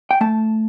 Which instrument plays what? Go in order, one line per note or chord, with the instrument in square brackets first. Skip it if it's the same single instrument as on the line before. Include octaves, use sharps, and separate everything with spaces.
[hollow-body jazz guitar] G5
A3 A5